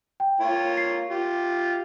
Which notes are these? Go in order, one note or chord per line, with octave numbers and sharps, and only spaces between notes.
G5
A#3 F4 C#5
C7
F4 G4